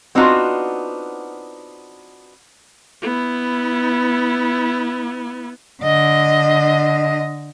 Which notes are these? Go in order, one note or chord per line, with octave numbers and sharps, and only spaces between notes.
B3 C4 D4 D#4 F4 F#4
B3 E4
D3 D#5